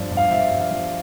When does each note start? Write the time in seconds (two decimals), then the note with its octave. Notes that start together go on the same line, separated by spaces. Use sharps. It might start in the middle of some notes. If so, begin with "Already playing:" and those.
Already playing: G2 F3 D5
0.11 G2
0.17 F5
0.31 F3 E5
0.51 G2
0.60 F5
0.71 F3